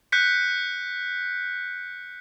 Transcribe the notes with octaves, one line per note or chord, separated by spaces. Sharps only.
F#6 G6 B6 C#7